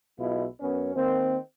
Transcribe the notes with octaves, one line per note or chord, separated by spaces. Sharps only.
B1 B2 G#3 E4 F4
F#2 B3 C#4
D#3 A#3 C4